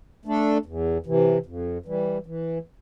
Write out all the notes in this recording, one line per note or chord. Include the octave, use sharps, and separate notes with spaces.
A3 D4 A4
E2
C3 E3
F2
E3 G3
E3